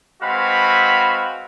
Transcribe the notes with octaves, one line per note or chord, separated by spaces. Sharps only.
G#3 C4 F#4 B4 F5 B5